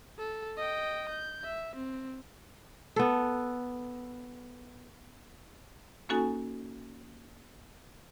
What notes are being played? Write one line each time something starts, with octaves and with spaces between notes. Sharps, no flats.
A4
D#5 G5
G6
E5
C4
B3 A4
A#3 C#4 D#4 F#4 A4 G#5